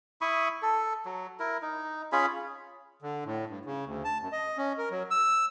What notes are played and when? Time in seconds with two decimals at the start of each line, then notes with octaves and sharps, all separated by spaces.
0.21 E4 B5 C#6 D#6
0.62 A4
1.05 F#3
1.40 E4 A#4
1.62 D#4
2.12 C#4 F4 G#4 B5
3.02 D3
3.25 A2
3.49 G2
3.65 C#3
3.86 D2
4.04 A5
4.21 F#2
4.32 D#5
4.58 C#4
4.78 A#4
4.91 F#3
5.11 E6